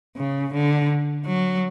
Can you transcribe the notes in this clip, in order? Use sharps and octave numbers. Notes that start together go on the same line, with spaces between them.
C#3
D3
F#3